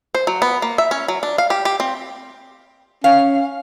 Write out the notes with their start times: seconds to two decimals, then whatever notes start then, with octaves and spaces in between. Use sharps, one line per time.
0.15 C5
0.27 F#3
0.42 B3
0.62 A#3
0.78 E5
0.91 C#4
1.08 F#3
1.23 D4
1.38 F5
1.50 G4
1.65 G4
1.80 C4
3.04 C#4 F5